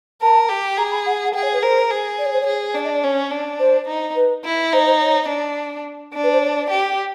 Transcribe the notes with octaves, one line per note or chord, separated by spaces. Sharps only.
A#4 A5
G4
G#4 A#5
B5
F#5
F#5
G#4 G5
C#5
B4
A#4 C5
G#4
D5
C#5
C5
C#5
G#4
D4 D5
D#5
D5
C#4 C#5
D4
C5
D#4
B4
E4
D#4 C5
C5
C#5
D4
D4
B4
C5
C#5
D5
G4